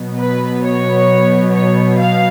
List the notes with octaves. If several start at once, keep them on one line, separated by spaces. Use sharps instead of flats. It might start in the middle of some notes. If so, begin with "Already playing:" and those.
Already playing: B2 F#3 B3
B4
C#5
C#5
F5